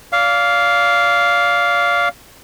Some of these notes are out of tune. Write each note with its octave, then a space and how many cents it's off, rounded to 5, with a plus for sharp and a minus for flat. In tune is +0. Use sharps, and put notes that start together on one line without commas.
D5 -35 F5 +0